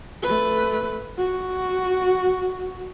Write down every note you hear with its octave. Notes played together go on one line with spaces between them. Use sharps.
A3 B4
F#4